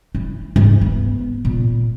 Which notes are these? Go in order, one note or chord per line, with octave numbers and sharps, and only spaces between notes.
E4
G#2
B3
A#2